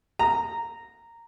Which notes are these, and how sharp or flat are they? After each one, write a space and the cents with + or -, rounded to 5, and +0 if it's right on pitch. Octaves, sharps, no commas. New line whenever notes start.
A#5 -10